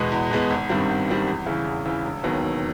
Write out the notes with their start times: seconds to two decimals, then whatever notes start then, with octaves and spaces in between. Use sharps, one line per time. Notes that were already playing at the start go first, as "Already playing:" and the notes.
Already playing: E2 B2 G#3 B3
0.12 E2
0.31 B2 G#3 B3
0.50 G#1
0.69 G2 D#3 G3 C4
0.89 G#1
1.08 G2 D#3 G3 C4
1.27 E2
1.46 C#3 E3
1.66 E2
1.85 C#3 E3
2.05 E1
2.24 D#2 D#3 F#3 B3
2.44 E1